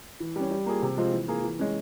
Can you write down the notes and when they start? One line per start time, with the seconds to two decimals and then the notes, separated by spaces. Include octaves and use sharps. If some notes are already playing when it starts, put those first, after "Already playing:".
0.20 E3
0.36 G3 C#4
0.51 G3
0.66 A#3 F4 G#4
0.82 C3
0.97 F3 G#3 C4 F4
1.12 E3
1.28 A#3 F4 G#4
1.44 E3
1.59 G#3 C#4